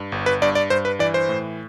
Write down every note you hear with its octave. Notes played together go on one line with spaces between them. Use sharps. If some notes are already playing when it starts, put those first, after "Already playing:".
Already playing: G2
G1
B4
G2 D5
D5
G2 C5
B4
E3 D5
C5
A2